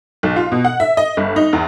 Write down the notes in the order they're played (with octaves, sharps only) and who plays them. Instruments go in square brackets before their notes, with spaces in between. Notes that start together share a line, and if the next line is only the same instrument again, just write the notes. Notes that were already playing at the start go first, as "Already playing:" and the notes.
[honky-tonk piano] B1
F4
B2
F#5
E5
D#5
G1
D#4
E2